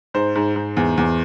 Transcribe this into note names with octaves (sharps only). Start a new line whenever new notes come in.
G#2 C5
G#2
G#2
E2
E2